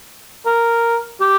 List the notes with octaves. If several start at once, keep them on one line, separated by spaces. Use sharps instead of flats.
A#4
G4